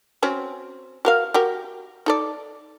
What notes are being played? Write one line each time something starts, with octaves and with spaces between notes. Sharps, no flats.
C4 C#4 F#4
F#4 A#4 F5
F#4 G4 A#4
D#4 A4 D5